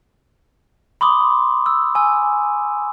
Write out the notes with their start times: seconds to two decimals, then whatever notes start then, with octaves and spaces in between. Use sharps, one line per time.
1.01 B5 C6 D6 D#6
1.66 E6
1.95 G#5 E6